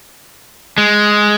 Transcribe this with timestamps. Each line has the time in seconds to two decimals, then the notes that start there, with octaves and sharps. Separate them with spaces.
0.78 G#3